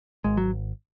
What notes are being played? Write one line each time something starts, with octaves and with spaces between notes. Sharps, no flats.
G#1 G#3
F#3